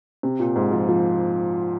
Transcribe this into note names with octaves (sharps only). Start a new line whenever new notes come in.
C3
A#2
G#2
F3
F3